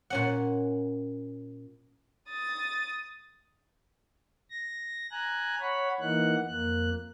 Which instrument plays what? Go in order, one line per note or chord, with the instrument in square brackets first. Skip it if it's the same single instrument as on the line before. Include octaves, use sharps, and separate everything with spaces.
[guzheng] A#2 C#4 F#5
[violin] D#6 A6
[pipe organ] A#6
G#5 A#5 F#6
C#5 F#5 B5
E3 A#3 D#4 F#5 F#6
F2 A#3 F#6